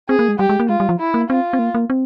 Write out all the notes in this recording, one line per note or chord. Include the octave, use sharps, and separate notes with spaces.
C4 G#4
A#3
G#3
G3 G4
G#3
A#3
G#3 F4
G3
F3
E4
A#3
C4 F4
C4
A#3
A#3
C4